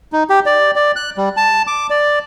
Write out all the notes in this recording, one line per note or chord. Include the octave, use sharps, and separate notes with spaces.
D#4
G4
D5
D5
F#6
G3
A5
D6
D5